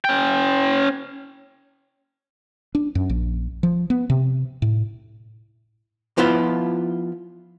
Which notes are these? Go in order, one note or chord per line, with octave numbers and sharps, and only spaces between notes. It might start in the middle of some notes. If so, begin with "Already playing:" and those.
C#4 G5
D4
F#2
A#1
F3
B3
C3
A2
F3 B3 E4 F4